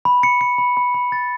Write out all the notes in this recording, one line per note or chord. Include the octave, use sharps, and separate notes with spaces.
B5
C#7
C#7
B5
B5
B5
A6